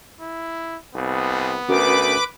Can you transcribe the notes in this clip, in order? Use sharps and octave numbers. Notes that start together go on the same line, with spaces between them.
E4
C2 B3
D2 C#4 F#4 A#4 B4 D6